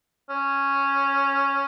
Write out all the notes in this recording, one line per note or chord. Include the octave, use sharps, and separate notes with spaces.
C#4